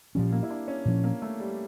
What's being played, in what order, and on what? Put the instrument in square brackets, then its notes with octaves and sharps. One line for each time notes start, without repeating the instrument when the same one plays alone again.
[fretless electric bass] A#2 F3 C#4 [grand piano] G3
[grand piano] A#3
E4
D4
C#4
[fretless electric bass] A#2 F3 C#4
[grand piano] A#3
A3
G3